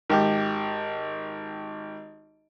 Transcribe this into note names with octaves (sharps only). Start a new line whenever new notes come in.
G#1 G4